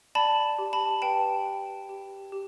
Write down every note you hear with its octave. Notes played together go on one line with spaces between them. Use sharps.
D5 A5 B5
G4
A5 B5
B4 G5 A5
B4
G4
G4